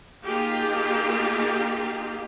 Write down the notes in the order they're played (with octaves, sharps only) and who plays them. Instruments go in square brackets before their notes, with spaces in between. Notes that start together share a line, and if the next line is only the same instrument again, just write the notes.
[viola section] A#3 D#4 F4 G4 G#4